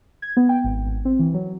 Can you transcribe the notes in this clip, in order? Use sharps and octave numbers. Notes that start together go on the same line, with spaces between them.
G#6
B3
G5
G#1
G#1
C4
E3
F#3